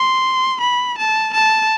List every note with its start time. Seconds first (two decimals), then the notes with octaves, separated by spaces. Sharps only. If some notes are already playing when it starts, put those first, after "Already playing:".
Already playing: C6
0.61 B5
0.98 A5
1.33 A5